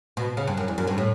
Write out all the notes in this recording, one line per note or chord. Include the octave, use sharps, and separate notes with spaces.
B2
C#3
G2
F#2
E2
F#2
G2
A2